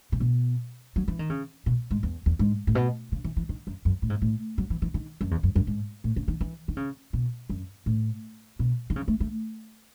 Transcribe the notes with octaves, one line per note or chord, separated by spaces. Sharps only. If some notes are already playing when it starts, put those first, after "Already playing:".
C#3
B2
F#3
E3
D#3
C#3
B2
G#2
E2
E2
G#2
A2
B2
C#3
E3
E3
D#3
F#2
F#2
A2
G#2
A2
F#3
E3
E3
D#3
F#2
E2
F#2
F#2
G#2
A2
C#3
D#3
E3
D#3
C#3
B2
F#2
A2
B2
D#3
C#3
A3
A3